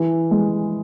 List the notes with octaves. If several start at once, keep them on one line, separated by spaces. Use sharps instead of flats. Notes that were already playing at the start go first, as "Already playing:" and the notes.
Already playing: E3
G#3